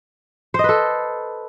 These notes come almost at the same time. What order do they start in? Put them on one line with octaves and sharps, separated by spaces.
C5 D#5 B4 A4